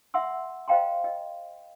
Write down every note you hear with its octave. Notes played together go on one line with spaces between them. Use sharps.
E5 F#5 C6 E6
C5 D#5 F5 G5 A#5 C6
D#5